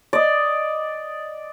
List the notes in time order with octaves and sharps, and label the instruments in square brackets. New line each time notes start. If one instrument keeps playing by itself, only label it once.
[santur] D5 D#5